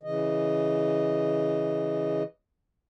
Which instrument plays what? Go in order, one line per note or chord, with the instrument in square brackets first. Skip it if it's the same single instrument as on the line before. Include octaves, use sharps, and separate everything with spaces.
[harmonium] C#3 E3 D#5